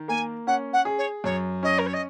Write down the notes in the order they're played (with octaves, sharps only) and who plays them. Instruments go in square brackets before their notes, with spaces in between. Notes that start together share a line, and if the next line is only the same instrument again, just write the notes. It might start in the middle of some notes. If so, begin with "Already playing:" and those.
Already playing: [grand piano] D#3
[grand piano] A#3 [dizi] G#5
[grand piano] C#4 [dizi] F#5
[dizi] F#5
[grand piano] G#4
[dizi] C#5
[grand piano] F#2 [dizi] C#5
[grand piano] C#4 [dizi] D#5
[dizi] A#4
C#5
D#5